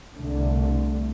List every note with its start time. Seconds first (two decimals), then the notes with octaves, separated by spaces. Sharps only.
0.15 C2 D3 A3